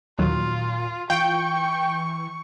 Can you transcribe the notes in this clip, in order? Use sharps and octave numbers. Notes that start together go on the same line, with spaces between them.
D#2 A#2 D#3 F#3 F4
E3 F4 G5 C#6